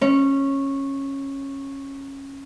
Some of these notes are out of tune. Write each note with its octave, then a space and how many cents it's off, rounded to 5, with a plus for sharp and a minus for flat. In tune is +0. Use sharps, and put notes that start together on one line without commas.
C#4 -15